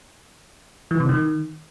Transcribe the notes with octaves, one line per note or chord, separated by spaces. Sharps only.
E3
C3
D#3